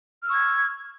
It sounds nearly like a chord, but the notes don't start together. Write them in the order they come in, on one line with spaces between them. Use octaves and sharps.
F6 E6 C#6 G#6